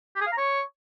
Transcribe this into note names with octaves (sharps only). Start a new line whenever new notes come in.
G4
G#4
F5
A#5
C#5